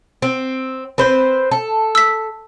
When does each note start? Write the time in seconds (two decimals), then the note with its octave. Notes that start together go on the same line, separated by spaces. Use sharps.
0.22 C4
0.98 C4 B4 C5
1.51 A4
1.95 E6 B6